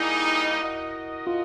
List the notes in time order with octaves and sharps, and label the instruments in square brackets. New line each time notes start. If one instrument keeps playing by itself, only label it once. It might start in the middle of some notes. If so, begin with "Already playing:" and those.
Already playing: [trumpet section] G3 A#3 D#4 G#4 [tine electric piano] E4
[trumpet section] F#4 A#4 D#5
[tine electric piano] F4